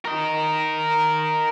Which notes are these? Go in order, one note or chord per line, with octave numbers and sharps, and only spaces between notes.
A#4 D#5